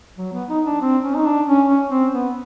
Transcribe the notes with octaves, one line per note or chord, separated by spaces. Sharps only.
F#3
B3
D#4
D4
C4
C#4
D#4
D4
C#4
C#4
C4
B3